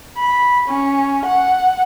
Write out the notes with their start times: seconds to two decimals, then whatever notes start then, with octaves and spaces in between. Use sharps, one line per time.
0.18 B5
0.68 C#4
1.26 F#5